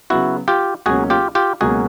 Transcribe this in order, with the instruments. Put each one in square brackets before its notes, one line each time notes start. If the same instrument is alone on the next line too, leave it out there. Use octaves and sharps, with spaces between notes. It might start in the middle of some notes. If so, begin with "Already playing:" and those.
[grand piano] C#3 F#3 B3 [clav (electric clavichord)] E4 F#4
[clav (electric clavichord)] F4 G4
[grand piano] C#2 B2 F#3 A#3 C#4 [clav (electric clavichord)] F#4 G#4
[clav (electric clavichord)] F4 G4
F4 G4
[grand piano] C#2 B2 F#3 A#3 C#4 [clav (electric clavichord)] F#4 G#4